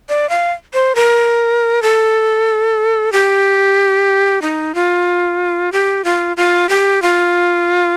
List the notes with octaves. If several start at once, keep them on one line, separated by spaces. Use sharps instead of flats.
D5
F5
C5
A#4
A4
G4
D#4
F4
G4
F4
F4
G4
F4